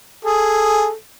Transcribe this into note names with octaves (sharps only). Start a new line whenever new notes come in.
G#4 A4